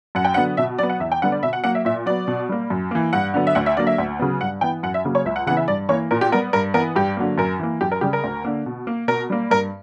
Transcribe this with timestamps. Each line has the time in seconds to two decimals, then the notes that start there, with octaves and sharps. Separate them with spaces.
0.15 F#2 F#5
0.25 G5
0.34 D3 F#3 B3 F#5
0.57 B2 E5
0.78 F#3 B3 D5
0.90 F#5
1.00 E2 E5
1.12 G5
1.22 D3 G3 B3 F#5
1.32 D5
1.43 B2 E5
1.53 F#5
1.64 F#3 A#3 F#5
1.75 E5
1.85 A#2 E5
2.06 F#3 B3 D5
2.28 B2
2.49 G3 A#3
2.70 F#2
2.91 E3 A#3
3.13 G2 F#5
3.34 D3 F#3 B3
3.47 E5
3.55 D2 F#5
3.66 E5
3.76 D3 F#3 A#3 D5
3.87 E5
3.98 D2
4.19 C#3 F#3 B3
4.41 G2 F#5
4.61 E3 B3 G5
4.83 F#2 F#5
4.94 E5
5.05 C#3 F#3 A#3
5.15 C#5
5.25 C#2 E5
5.36 F#5
5.46 C#3 E3 B3 F#5
5.57 E5
5.68 G2 D5
5.89 E3 A#3 C#5
6.11 A#2 A#4
6.21 G4
6.32 G3 B3 A#4
6.53 G2 A#4
6.74 E3 B3 A#4
6.96 G2 G4
7.17 D3 F#3 A#3
7.38 F#2 A#4
7.59 E3 A#3
7.81 F#2 G4
7.92 A#4
8.01 C#3 G3 G4
8.13 A#4
8.24 D2
8.44 D3 A#3
8.66 B2
8.87 A#3
9.08 B2 A#4
9.30 G3 A#3
9.50 G2 A#4